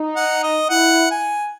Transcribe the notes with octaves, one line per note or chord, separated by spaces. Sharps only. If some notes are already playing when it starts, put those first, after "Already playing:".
Already playing: D#4
F#5
D#5
E4 F#5
G#5